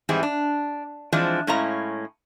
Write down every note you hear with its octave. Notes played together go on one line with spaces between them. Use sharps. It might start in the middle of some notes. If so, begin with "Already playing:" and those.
G#2 E3 G3 C4 E4 G#4
D4
E3 F3 G#3 C4 D4 D5
A2 G#3 C#4 E4 F5 A#5